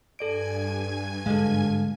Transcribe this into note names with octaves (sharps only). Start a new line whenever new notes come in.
G2 A4 D5 G#5 G#6 D7
G#2 D3 G#3 A4 F5